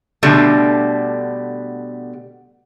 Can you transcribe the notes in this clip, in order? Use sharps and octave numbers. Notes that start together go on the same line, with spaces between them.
B2 D3 G3 A3